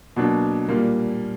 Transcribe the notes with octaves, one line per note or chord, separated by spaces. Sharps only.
B2 F#3 A#3 D4
A#2 G3 A#3